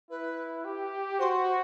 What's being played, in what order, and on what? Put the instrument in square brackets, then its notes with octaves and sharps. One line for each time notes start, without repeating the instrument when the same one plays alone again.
[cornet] E4 [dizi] B4
[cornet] G4
[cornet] F#4 [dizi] C5
[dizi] C5